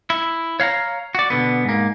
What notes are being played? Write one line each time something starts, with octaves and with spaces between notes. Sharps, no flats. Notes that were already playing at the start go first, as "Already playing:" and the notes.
E4
C#5 F5 F#5 A#5
F#4 D5
B2 D3 B3
G#2 A#3